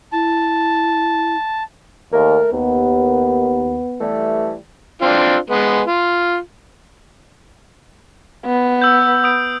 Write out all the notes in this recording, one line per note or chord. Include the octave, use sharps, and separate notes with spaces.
E4 A5
D#2 A3 A#4
D#2 B3
E3 G3 A3
C4 D4 F4
G#3 B3
F4
B3
E6 G6
D#6 D7